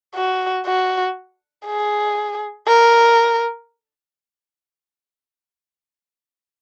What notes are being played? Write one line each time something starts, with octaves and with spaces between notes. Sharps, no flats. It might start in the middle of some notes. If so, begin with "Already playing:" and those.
F#4
F#4
G#4
A#4